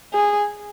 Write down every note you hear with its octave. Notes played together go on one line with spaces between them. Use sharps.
G#4